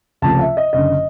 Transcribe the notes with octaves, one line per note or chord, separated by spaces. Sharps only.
C#2 C3 F3 A3 A5
E5
D#5
F#1 F#2 D3 D#5